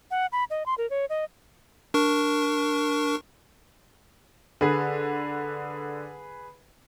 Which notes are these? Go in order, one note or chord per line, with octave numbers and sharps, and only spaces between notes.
F#5
B5
D#5
C6
A#4
C#5
D#5
D4 A#4 C#6
D3 G#4 B4